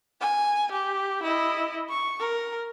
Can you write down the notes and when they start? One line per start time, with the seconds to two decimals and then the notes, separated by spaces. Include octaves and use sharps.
0.21 G#5
0.72 G4
1.23 E4 D#5
1.90 C#6
2.20 A#4